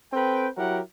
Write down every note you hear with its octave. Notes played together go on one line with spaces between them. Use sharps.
C4 A4 B4 G5
F#3 E4 G4 A#4 F#5